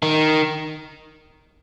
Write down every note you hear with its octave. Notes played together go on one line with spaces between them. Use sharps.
D#3